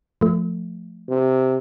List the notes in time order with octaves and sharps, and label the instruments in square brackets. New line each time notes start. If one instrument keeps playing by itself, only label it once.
[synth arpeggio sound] F3 A3
[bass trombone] C3